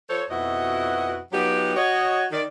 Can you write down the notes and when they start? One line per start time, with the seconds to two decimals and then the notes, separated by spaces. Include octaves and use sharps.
0.10 F3 A4 C5 C#5
0.31 F2 B2 E4 F#4 D#5 F#5
1.32 F#3 B3 D#4 F4 G4
1.76 F#4 C#5 D#5
2.31 D#3 D5